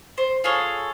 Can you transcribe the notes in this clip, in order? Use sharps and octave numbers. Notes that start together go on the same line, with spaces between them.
C5
F4 G#4 A4 C#5